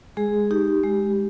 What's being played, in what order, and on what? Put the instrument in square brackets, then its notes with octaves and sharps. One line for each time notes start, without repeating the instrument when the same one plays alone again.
[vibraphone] G#3 G#4
D#4 G4
G#3